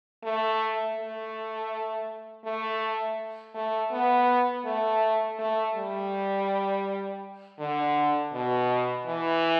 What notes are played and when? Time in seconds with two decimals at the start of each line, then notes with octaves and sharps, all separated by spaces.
0.24 A3
0.98 A3
2.45 A3
3.55 A3
3.92 B3
4.65 A3
5.39 A3
5.75 G3
7.59 D3
8.33 B2
9.07 E3